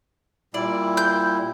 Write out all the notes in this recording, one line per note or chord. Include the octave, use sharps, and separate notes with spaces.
A#2 G3 E4 D5
G6